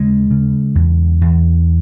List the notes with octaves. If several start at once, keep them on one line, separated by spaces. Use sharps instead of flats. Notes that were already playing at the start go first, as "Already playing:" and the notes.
Already playing: D#2 C#3 G#3
C#3
E2
E2